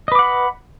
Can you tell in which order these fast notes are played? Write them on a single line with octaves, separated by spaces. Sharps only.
D#5 B4 D6 F#5 B5